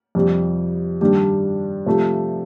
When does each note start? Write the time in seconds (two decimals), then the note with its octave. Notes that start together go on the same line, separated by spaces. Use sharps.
0.15 F2 C3 G3
1.01 G2 D#3 G3 D4 G4
1.86 C3 F3 A3